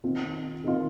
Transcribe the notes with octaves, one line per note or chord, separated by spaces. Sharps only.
D#3 C4 F4
D#3 C4 F4